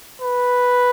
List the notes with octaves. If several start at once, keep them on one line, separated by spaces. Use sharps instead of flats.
B4